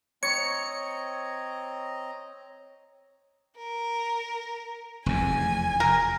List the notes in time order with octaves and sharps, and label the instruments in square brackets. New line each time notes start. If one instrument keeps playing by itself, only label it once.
[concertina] C4 D#5 A#5 [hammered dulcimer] C#5 [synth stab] C#7
[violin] A#4
[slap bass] F1 E2 [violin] G#5
[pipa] A#4